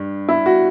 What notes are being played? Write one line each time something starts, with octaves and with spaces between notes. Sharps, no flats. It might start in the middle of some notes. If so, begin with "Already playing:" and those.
Already playing: G2
E4
F#4